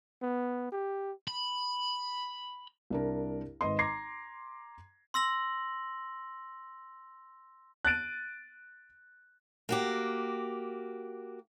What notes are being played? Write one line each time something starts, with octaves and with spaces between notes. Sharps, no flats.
B3
G4
B5
C2 D4 A#4
G#1 B4 D#5 C6
A#5 C6 D6 G#6 A#6 C7
C6 E6 A#6 F#7
F#6 A6 D7 D#7
A#3 F#4 G4